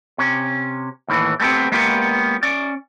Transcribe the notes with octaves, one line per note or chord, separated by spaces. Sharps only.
C3 C#4
D#2 A2 D3 E3
G3 A3 B3 C4 G4
G#3 A#3 B3 C#4 F4 G4
C#4 D5